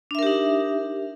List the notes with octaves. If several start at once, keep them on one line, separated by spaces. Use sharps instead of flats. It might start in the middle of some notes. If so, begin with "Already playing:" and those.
D4 D#4 G4 A#4 E5